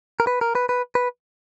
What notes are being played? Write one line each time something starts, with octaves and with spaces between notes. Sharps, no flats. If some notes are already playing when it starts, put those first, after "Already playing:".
A#4
B4
A#4
B4
B4
B4